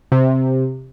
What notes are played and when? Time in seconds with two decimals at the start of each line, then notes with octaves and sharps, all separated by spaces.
0.12 C3